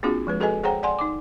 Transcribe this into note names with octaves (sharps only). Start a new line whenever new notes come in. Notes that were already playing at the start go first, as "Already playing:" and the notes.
A#3 C4 D4 F4 F#4 G#4
F3 G#3 B4
F#4 G#4 A4 B4 D#5 G#5
G#4 C5 C#5 F#5 G5 A#5
D5 F#5 G#5 C6
D#4 D6